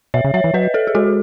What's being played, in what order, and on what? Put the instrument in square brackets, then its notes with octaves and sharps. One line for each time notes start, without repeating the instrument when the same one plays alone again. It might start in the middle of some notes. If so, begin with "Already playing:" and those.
[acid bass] B2 [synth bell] C#5 E5
[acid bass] C#3
[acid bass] F#3 [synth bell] C#5 E5
[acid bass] E3
[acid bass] F#3 [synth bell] B4 D#5
[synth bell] A4 C#5
G#4
[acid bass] G#3 [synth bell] F#4 A4